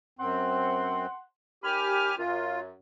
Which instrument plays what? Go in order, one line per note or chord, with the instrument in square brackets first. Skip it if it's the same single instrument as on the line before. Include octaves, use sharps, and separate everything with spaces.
[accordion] F#2 C4 [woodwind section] F#5 C6
[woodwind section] D#2 B5 [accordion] G4 G#5 F6
[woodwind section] F#2 [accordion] F4